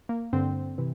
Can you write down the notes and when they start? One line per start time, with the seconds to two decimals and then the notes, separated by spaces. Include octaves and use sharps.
0.09 A#3
0.33 G2 D3 C4
0.78 C3 E3